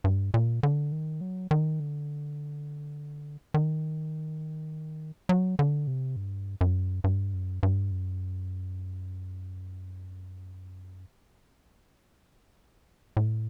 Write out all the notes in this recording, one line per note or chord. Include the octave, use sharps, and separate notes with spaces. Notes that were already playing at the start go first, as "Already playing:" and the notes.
G2
A#2
D3
D#3
F#3
D#3
D3
D#3
F#3
D3
C3
G2
F#2
G2
F#2
G2
F#2
A2